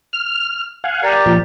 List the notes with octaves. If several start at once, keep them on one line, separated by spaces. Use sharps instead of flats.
F6
F5 F#5 G#5
G4 A#4 D5
A#2 F3